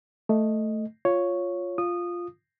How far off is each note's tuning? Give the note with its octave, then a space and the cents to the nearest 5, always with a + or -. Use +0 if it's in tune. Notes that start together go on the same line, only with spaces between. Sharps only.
A3 +0 D#5 +0
F4 +5 C#5 +0
F4 +0 D#6 -15